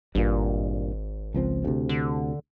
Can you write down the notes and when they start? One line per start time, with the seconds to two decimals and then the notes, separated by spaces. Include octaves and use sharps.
0.15 G#1 G2 A#2
1.34 C#2 F3 C4
1.65 D2 C3
1.89 D3